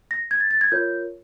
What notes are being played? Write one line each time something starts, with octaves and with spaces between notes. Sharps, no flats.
A#6
G#6
A6
A6
G#6
F4 A#4 C#5 G6